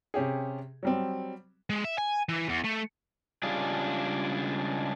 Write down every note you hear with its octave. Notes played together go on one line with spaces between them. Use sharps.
C3 C#4 G4 G#4
F#3 G3 C4
G#3
E5
G#5
E3
E2
A3
C#3 G3 G#3 D4 F4 G#4